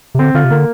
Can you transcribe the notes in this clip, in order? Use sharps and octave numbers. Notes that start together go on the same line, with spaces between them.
C3
D3 C4
D3 F4
C3
D3 A#3